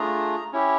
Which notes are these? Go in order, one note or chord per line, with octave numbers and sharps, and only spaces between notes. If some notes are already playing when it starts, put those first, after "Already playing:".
Already playing: A3 D4 F4 G#4 A#5
C#4 E4 G4